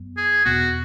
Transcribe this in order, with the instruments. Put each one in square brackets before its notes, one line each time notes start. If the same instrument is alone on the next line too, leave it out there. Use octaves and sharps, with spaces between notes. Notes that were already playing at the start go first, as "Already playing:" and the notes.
Already playing: [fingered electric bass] F#2 F#3 B3
[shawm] G#4
[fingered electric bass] E2 B2 B3 [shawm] F#4